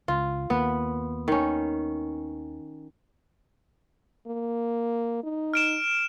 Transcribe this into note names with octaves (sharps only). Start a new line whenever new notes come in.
C#2 F4
D#2 A#3 B3
D#3 C#4
A#3
D#4
F6 D7 E7